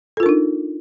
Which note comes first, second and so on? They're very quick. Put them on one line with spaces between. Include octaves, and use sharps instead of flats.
A4 F4 A#4 D4 D#4